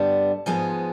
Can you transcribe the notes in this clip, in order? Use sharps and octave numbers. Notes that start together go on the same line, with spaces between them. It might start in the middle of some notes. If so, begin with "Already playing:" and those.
Already playing: G2 D3 G3 B3 A5
G#2 F3 G#3 B3 G#5